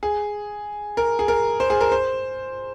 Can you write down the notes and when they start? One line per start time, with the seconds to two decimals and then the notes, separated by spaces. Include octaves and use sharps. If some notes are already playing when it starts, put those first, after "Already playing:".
0.03 G#4
0.97 A#4
1.19 G#4
1.28 A#4
1.60 C5
1.70 G#4
1.81 A#4
1.92 C5